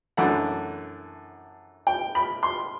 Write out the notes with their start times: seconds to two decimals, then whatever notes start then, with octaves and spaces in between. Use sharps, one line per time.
0.17 F#2 E3 A3 D4 F#5
1.87 G5
2.15 B5
2.43 C6